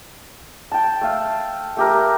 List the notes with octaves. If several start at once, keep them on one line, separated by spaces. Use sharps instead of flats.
G5 A5
A3 F5
A3 G4 A#4